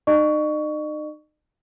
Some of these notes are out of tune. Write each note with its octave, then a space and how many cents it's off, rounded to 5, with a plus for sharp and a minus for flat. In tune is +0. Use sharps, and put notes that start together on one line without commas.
D#4 -30 D#5 -45 C#6 +20